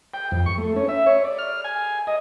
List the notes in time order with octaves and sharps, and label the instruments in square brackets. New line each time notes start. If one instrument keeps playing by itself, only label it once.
[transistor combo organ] G5
F2
C#6
A3
C#4
E5
C#5
D5
F6
G#5
D#5